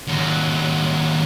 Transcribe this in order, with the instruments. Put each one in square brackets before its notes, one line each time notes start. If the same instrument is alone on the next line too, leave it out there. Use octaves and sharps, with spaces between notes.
[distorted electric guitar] D#2 F#3